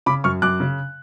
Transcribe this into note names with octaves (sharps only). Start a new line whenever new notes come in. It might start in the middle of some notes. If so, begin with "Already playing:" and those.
C#3 B5 D6
F#2 C#6 F6
F#2 D6 F#6
C#3